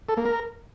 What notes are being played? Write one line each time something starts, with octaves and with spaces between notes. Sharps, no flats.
A4
A#3
A#4